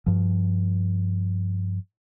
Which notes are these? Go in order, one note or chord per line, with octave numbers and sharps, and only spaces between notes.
G2 F3